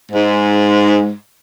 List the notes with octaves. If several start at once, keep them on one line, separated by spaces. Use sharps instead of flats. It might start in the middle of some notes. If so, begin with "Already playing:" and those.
G#2